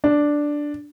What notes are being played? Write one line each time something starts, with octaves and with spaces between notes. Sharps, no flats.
D4